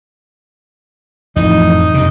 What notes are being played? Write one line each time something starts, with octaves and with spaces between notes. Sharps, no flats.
F2 A2 E3 D#4
F#2 C3